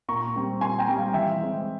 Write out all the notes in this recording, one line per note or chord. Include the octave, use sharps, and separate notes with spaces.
A#2 A#5 C#6
G3 C4
A#2 G#5 C6
G5 A#5
G3 C4
F5 G#5
E3 E5 G5
G#3 C4